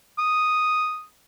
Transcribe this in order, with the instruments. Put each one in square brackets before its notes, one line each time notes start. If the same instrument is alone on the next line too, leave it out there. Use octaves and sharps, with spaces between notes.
[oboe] D#6